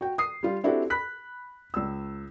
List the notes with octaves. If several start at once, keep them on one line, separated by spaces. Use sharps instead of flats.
F#4 G5
D#6 C7
G3 F4
C4 D4 E4 F#4 G4 A4
B5 F#6 B6
C#2 E6